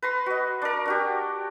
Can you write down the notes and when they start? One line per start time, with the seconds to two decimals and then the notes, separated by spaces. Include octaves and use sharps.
0.02 B4 A#5 C6
0.26 F#4 D#5
0.62 D4 A#4
0.85 D4 F#4 G4